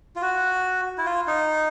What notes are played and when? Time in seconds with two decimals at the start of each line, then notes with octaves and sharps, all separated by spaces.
0.16 F4
0.22 F#4
0.98 E4
1.06 F4
1.27 D#4